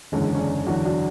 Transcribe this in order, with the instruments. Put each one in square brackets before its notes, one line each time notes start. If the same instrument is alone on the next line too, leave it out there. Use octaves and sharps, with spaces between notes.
[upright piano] F#1 E2 D3 G#3 C#4
C#4
D4
E2 D3 F#3 D4 F#4
D4 F#4